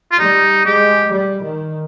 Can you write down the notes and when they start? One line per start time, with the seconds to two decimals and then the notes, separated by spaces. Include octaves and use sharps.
0.11 F4
0.18 G3 D#4
0.65 G#3 G4
1.12 G3
1.42 D#3